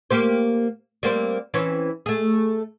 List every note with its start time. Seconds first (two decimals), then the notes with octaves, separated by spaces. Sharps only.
0.11 A#3 G4 C5
1.03 G3 A#3 C4
1.54 E3 C4 C#4
2.06 A3 G#4